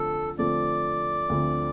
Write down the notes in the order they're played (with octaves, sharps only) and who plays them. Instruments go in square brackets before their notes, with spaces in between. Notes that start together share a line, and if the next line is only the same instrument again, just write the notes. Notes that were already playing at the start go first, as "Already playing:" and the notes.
Already playing: [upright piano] D3 F3 A3 C4 [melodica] A4
[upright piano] D3 F3 A3 C4 [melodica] D5
[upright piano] D2 D3 F3 A3 C4